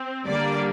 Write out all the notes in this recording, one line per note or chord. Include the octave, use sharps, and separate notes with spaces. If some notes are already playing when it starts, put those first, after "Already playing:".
Already playing: C4
D3 G3 A#3 D5